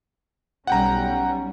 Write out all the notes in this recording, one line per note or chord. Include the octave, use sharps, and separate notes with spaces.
B1 G3 C#4 F#5 G5 A#5